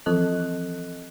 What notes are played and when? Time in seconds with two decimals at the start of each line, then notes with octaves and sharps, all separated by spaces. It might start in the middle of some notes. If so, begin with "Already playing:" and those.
0.06 E3 F3 C4 A4 D#5 F#6